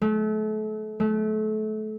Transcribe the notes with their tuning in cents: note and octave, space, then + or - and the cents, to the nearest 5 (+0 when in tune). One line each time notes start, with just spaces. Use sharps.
A3 -35
A3 -30